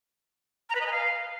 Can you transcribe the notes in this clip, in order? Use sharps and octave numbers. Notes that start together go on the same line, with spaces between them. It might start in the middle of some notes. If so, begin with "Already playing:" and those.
A#5
B4
D#5
G#5
F5